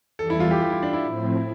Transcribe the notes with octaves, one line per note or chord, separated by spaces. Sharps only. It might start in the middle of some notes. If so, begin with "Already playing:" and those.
E2 E3 G3 A4
E4
F4
G4
G4
E4
D4
E4
A2 F3 C4